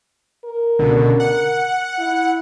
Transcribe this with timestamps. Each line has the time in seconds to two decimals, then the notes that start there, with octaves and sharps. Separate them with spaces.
0.45 A#4
0.79 C#2 B2 D3
1.20 F#5
1.98 E4